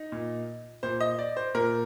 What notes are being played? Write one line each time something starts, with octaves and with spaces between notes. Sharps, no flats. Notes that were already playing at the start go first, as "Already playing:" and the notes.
Already playing: D#4
A#2
A#2 C5
D#5
D5
C5
A#2 A#4